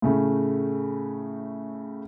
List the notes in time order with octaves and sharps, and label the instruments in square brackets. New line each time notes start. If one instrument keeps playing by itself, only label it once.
[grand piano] A2 C#3 A3